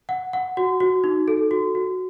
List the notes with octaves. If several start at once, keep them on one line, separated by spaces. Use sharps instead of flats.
F#5
F#5
F#4
F#4
D#4
A4
F#4
F#4